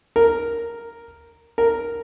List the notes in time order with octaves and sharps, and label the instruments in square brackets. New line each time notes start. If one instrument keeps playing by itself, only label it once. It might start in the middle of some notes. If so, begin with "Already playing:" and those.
[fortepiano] A#4
A#4